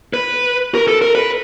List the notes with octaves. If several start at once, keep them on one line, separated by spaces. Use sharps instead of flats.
B4
A#4
A4
A#4
B4